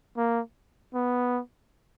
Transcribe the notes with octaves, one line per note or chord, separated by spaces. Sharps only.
A#3
B3